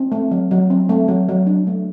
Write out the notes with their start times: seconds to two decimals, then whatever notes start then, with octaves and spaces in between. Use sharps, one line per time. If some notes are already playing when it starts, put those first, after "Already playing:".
Already playing: C4
0.12 A3
0.31 F#3
0.51 F#3
0.70 C4
0.89 A3
1.08 F#3
1.29 F#3
1.47 D4
1.67 A3